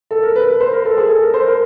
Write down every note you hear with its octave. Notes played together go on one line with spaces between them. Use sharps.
A4
A#4
B4
B4
C5
A#4
A4
G#4
A4
A#4
C5
A#4